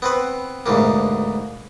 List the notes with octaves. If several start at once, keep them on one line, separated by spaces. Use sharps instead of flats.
B3 C4 B4
D2 G#2 B2 A#3